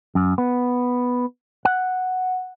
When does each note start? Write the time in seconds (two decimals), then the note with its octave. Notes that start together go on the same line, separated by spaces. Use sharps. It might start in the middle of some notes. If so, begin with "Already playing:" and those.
0.15 F#2
0.38 B3
1.65 F#5